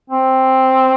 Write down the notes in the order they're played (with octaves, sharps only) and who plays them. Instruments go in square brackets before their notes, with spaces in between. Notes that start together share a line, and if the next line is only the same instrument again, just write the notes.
[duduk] C4